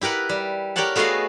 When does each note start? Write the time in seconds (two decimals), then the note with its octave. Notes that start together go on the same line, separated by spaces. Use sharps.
0.01 E4 G4 A#4 B4 F#5
0.29 G3
0.76 G4 A#4 C#5 D5 F#5 A5
0.95 A3 B3 F#4 G#4 D#5 F5